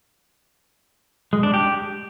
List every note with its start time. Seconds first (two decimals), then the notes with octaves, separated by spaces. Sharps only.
1.33 G#3
1.43 D4
1.54 G4